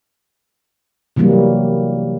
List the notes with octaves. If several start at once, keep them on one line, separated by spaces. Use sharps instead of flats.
C3 E3 F#3 G3 A#3